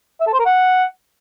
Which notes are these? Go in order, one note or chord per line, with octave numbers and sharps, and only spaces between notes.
E5
A4
C5
A#4
F#5